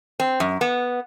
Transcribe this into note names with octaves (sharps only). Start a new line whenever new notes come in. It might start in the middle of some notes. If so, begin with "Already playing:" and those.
C4
F#2
B3